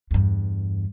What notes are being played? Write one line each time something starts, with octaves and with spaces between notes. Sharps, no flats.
E2 G2